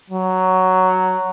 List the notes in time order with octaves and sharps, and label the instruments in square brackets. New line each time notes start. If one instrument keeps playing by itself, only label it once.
[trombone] F#3